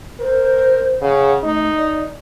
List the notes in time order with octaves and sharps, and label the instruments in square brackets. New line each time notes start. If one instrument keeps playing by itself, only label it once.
[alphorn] A#4 [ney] C5
[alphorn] C#3 [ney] F#5
[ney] A3 [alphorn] D#4
[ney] D5